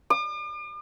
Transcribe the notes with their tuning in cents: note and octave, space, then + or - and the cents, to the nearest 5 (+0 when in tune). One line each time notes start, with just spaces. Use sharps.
D6 +45